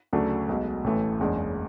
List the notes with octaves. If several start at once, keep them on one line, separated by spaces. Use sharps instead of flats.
D2 C#3 F#3 A3 D4
B1 B2 G#3
A1 A2 E3 A3
F#1 E2 C#3 G#3 D4